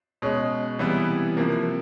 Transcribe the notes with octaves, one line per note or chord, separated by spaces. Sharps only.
B2 G#3 C#4
C3 E3 G3 B3 E4
C3 F3 A#3